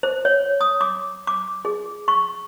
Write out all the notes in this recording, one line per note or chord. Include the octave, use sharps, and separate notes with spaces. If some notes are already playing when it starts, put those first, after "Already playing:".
C5
C#5
D#6
D6
D6
G#4
C#6